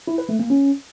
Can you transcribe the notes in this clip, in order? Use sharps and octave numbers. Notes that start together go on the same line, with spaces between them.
E4
B4
A3
A#3
C#4